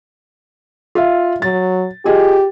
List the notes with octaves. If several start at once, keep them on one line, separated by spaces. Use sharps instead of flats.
F4 E5 F5
F#3 A6
F4 G4 G#4 D#5